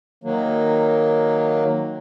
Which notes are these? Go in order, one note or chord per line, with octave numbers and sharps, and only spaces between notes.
D#3 F#3 A#3